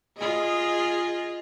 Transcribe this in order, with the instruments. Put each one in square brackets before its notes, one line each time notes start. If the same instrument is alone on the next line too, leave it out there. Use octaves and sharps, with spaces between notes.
[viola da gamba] F4 G#4 D#5